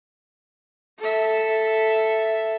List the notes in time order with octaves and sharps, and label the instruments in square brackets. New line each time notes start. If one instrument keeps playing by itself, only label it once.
[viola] A4 E5